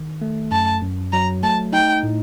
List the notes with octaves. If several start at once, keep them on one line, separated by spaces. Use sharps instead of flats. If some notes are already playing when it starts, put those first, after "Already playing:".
Already playing: D#3
A3
F#2 A5
F#2
F#3 A#5
A3 A5
D#4 G5
A2